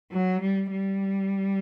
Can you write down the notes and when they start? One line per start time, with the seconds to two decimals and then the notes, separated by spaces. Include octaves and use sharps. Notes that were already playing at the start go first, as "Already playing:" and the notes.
0.11 F#3
0.41 G3
0.71 G3